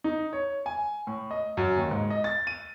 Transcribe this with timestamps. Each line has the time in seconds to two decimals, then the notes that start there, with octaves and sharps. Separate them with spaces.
0.04 D#4
0.33 C#5
0.66 G#5
1.07 A2
1.31 D#5
1.57 F#2
1.77 D#2
1.91 G#2
2.10 D#5
2.24 A6
2.47 D#7